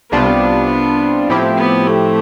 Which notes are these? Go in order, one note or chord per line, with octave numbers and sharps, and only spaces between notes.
C2 C3 G3 B3 D4 F4
A2 F3 C4 E4 G4
B3
A3